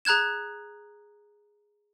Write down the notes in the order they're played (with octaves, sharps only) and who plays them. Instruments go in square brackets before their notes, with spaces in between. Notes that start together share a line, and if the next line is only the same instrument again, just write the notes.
[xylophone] G#4 A#5 F#6 G#6 E7